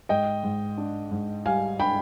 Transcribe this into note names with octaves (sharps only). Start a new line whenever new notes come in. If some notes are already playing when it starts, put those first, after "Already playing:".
G#2 D#5 G5
G#2
D4
G#2
G3 F5 G#5
D4 G5 B5